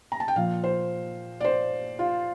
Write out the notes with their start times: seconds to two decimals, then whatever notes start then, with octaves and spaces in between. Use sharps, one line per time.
0.12 A#5
0.20 A5
0.28 G5
0.36 A#2 F3 F5
0.64 C5
1.41 D5
1.45 C5
1.99 F4